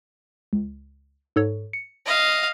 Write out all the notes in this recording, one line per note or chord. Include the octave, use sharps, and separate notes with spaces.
C#2
G#2 A4 C#5
C#7
D#5 F5